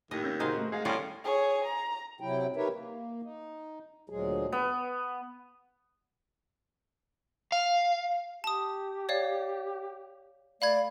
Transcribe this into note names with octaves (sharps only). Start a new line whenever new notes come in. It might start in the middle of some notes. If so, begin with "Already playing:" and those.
D#2 A2 D#5
C#4 E6 G6 A#6
C#3 D#4 F#4 G#4 A#4 C5 D#5 F5
A3 B3
G#3 F#4 G#4 F5
A2 G3 C#4 F4
G#4 C#5
A#5
C3 F#3 E4 G5
D#4 G4 A#4 B4 C#5 E5
A#3
D#4
D2 A#2 F3 F#3 G#3 G#4
B3
F5
G4 A5 D#6
C#5 D5 F5
A3 D5 F5 B5 G#6